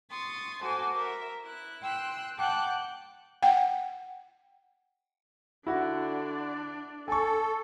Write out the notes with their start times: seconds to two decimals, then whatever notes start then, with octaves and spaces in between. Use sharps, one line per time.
0.10 C6 C#6 D#6 A6
0.63 F#4 A4 C5 G#5 D6
0.94 A#4 E5
1.45 E4 F#6
1.83 G5 C6 E6 F#6
2.39 F#5 G5 A5 D6 F#6 G6
3.43 F#5 G5
5.67 D3 D4 E4 F#4
7.08 A4 G#5 C#6